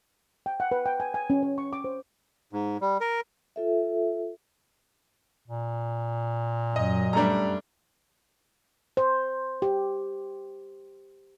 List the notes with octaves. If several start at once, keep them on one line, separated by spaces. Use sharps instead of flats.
G5
F#5
B4
G5
G#5
G#5
C#4
C#5
C#6
D6
C5
G#2
G3
A#4
F4 A4 E5
A#2
F#2 D#5
G2 G3 A3 D4 A#5
C5
G4